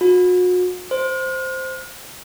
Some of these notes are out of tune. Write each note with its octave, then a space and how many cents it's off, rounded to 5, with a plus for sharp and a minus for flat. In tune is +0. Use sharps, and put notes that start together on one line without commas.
F#4 -40
C5 +0